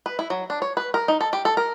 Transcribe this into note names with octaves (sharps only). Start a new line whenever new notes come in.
B4
E4
F#3
D4
C#5
B4
A#4
D#4
A4
G4
A4
A#4